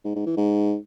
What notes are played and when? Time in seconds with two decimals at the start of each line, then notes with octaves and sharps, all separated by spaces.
0.05 G#2
0.16 G#2
0.26 E3
0.37 G#2